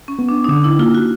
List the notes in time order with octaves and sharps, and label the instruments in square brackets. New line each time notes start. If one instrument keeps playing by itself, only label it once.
[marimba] C#4
[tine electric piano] B3
[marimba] D4
D#4
[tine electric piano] D3 [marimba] D4
[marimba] E4
[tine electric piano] A#3 [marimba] F4
[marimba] F#4